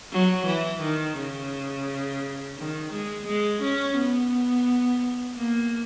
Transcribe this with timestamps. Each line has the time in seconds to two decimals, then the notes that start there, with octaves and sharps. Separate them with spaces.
0.12 F#3
0.47 E3
0.82 D#3
1.18 C#3
2.58 D#3
2.93 G#3
3.27 G#3
3.63 C#4
3.97 B3
5.37 A#3